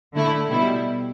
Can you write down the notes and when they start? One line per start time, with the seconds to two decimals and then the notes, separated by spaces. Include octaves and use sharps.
0.14 D3 A3 E4
0.50 B2 G3 E4